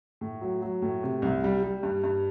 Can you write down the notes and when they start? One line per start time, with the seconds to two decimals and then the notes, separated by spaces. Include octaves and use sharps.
0.21 A2
0.41 F#3
0.62 F#3
0.82 A2
1.03 C3
1.22 C2
1.44 G3
1.63 G3
1.83 G2
2.04 G2